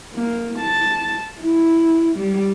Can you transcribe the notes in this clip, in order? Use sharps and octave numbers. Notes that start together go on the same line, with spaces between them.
A#3
A5
E4
G3